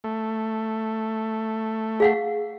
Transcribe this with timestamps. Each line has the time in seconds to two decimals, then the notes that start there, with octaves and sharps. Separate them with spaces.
0.04 A3
2.00 G#4 F5 F#5